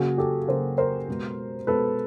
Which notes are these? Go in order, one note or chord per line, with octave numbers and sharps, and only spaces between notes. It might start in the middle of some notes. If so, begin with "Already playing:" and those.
Already playing: C#3 F#3 A#3 F#4 G#4
G4 A4
C#3 F#3 A#3 A#4 C5
A#4 C5
B2 G#3 B3
B2 G#3 B3 A4 B4